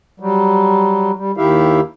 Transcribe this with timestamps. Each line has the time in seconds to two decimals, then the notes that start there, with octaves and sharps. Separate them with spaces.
0.20 F#3 G3
1.16 G3
1.37 D#2 D#3 E4 G4 E5 F5